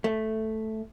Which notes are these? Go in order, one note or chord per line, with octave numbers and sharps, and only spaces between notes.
A3